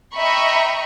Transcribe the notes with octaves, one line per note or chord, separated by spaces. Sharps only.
D#5 E5 G5 A#5 B5 C#6